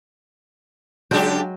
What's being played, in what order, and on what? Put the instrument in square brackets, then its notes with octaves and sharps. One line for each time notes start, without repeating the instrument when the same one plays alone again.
[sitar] C#3 D4 G4 [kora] F#3 G#3 G5